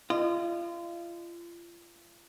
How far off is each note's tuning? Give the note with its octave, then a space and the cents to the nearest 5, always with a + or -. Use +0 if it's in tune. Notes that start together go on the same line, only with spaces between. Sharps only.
F4 -30 D#5 -35